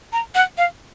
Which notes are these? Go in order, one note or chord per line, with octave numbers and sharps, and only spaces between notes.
A#5
F#5
F5